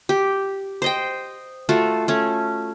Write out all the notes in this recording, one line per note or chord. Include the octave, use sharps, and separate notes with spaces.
G4
C5 D#5 G5
A3 F4 F#4 A4
A3 C#4